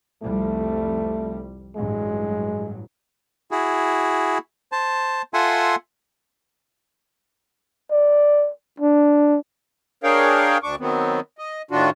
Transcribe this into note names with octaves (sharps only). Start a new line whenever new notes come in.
C2 F2 G3 A3
A1 G2 F#3 G#3
E4 F#4 G#4
C5 A5
F4 A4 E5 F#5 G#5 C6
D5
D4
D4 G#4 A#4 C#5 F5 G5
D2 D4 C#6 D6
D#3 F#3 B3 C4
D#5
A2 D#3 D4 F4 F#4